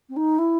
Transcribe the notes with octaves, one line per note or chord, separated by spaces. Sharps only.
C4
D#4
E4